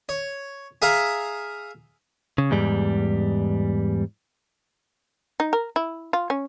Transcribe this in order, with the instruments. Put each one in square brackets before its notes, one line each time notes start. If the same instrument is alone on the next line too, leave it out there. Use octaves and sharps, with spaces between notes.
[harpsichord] C#5
G#4 E5 F5 A#5
[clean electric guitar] C#3
E2 G#2 G3
[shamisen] D#4
A#4
E4
F4
C#4